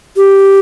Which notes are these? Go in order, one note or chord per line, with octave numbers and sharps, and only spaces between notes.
G4